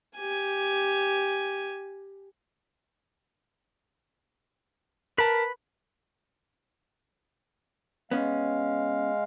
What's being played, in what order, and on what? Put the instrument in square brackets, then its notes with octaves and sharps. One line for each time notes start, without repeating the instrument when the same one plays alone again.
[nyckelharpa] G4 G#5
[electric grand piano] A#4 A5 [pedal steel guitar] B4 B5
[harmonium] G#3 F5 [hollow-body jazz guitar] B3 C#4